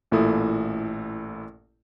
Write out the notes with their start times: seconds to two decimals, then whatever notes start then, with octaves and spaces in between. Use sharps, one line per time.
0.12 A1 A#2 A3 E4 A4 D#6